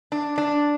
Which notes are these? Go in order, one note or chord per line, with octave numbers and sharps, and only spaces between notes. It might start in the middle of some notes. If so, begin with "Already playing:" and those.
D4
D4